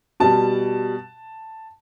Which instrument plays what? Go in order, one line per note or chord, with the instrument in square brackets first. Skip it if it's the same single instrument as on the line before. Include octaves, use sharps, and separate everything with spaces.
[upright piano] B2 G3 A5